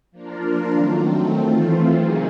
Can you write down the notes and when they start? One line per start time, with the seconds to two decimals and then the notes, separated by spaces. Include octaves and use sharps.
0.11 F3 A#3 D4 F4 A#4
0.72 D#3 F#3 A3 C4
1.31 E3 A3 C4 F4
1.92 C#3 F#3 A#3 D#4 G#4